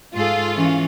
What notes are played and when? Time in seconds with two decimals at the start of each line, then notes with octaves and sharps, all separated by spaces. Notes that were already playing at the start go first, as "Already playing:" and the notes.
0.14 G#2 F4 G#4 A4
0.55 E3 C#4